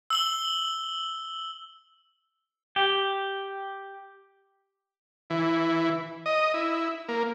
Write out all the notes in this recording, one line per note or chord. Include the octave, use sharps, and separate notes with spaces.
E6 F#7 G7
G4
E3
D#5
E4
A#3